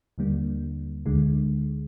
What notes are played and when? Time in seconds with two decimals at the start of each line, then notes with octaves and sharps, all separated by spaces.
0.18 D#2 D3 G3 A#3
1.06 D2 D3 G#3